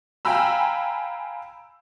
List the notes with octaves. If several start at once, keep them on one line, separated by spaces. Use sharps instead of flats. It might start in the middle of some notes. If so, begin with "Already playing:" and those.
F5 G5 G#5 A#5 B5 E6